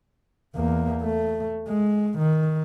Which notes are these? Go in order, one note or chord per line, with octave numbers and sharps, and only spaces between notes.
E2 A#3
A3
G#3
D#3